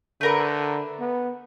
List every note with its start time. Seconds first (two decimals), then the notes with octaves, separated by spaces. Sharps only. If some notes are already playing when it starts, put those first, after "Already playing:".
0.21 D3 A3 A#4 B4
1.00 B3